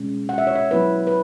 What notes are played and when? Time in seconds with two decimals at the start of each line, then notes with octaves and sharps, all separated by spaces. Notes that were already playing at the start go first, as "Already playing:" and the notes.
Already playing: B2 G#3 C#4
0.29 F#5
0.38 E5
0.47 C#5
0.56 E5
0.71 F#3 B3 E4 B4
1.07 B4